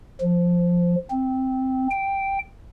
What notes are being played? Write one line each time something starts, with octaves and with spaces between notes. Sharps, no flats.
F3
C4
G5